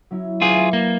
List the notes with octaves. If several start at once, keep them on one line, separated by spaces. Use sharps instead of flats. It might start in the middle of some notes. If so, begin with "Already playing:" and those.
F#3 C#4 E4
F4 G#4 B4 D5 E5
A#3 A6